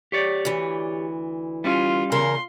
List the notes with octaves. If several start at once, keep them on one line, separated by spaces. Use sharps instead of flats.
G4 C#5 D5
D2 E3
G3 C#4 F4
E2 C#3 A#4 C6